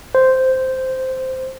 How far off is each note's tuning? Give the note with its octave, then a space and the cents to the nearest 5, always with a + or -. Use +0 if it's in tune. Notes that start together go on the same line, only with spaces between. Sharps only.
C5 -5